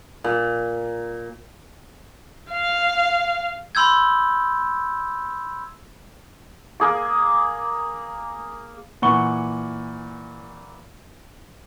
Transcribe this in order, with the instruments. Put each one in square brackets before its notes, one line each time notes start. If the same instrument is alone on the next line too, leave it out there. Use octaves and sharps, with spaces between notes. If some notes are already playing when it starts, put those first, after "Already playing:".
[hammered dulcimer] A#2
[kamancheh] F5
[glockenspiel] B5 C6 E6 G6 G#6
[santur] A#3 G#4 D6
[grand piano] A#2 E3 F#5 C#6 G7